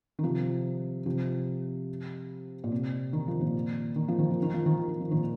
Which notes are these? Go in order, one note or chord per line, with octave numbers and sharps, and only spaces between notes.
D#3
C3 F3
C3 F3
A#2
C3
D#3
F3
A#2 D#3
D#3
F3
D#3
F3
D#3
F3
D#3
F3
D#3
F3
A#2 D#3